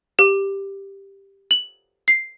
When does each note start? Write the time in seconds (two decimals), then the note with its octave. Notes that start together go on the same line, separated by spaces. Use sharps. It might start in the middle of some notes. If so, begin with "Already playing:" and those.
0.19 G4
1.51 F#7
2.08 C7